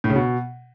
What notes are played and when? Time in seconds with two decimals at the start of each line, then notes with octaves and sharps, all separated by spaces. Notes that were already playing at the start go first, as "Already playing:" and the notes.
0.04 A2
0.10 C#3
0.16 B2